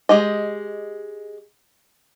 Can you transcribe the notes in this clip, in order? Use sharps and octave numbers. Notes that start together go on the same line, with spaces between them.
G#3 G4 D#5